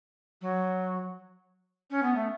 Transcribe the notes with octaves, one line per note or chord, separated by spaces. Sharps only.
F#3
C#4
B3
A3